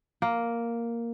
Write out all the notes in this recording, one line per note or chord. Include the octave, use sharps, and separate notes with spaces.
A#3